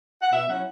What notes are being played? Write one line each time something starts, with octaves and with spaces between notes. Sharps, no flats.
F#5
B2 E5
F#3 C#4 E4 F#5